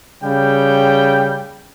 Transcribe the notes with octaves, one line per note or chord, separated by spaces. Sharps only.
C#3 G3 G5